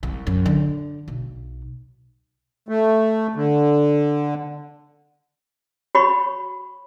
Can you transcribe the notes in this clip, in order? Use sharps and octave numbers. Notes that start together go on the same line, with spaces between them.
C2
F#2
D3
B1
A3
D3
F#4 C#5 B5 C#6